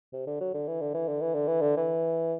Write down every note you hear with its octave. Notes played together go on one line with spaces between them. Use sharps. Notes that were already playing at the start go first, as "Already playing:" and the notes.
C3
D3
F#3
D3
E3
D3
E3
D3
E3
D3
E3
D3
E3